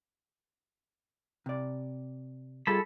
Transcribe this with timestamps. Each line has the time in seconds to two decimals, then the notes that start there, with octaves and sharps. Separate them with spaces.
1.46 C3 D5
2.67 G3 F4 G#4 A4 A5 B5